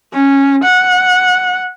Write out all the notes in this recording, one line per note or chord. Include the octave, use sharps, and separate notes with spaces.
C#4
F#5